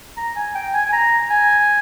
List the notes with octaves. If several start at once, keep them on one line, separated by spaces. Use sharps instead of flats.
A#5
G#5
G5
G#5
G#5
A#5
G#5